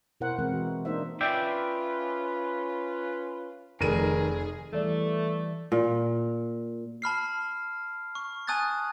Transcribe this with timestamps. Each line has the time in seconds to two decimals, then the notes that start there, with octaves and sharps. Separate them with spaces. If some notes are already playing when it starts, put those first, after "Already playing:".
0.21 B2 E4 A#4 C5 F#5
0.39 E3 G#3 C4 A#4
0.53 F#4
0.85 A#3 D4 D#4 C5 E5
1.21 C#4 F4 B4 D5 E5 G5
3.81 F1 D#3 G#4 A#4 D#7
4.73 E3 G3 A3 D5
5.72 A#2
7.02 A5 B5 F6 C7
8.15 C#6
8.47 G#5 A5 D#6 F#6 G#6 A6